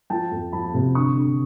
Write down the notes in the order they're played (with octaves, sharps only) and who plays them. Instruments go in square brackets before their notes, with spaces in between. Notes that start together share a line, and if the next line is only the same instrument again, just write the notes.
[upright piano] F3 G5 A5
F2
F3 A5 B5
C3
D3 C#6 D#6
D3